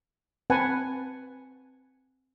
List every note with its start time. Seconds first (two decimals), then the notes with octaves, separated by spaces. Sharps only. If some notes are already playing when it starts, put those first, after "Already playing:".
0.50 C4 B4 F#5 G#5 A5